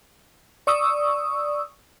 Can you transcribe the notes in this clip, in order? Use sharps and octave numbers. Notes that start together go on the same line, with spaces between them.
D5 C#6 D#6 E6